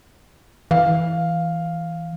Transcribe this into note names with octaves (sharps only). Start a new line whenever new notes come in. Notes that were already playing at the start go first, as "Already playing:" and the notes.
E3 F5